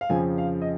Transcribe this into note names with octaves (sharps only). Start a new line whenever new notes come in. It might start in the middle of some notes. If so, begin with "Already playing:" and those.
F5
F2 C#3 F3 G#5
F5
D#5